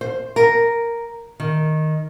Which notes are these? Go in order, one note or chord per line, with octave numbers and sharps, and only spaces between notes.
C5
A#4
D#3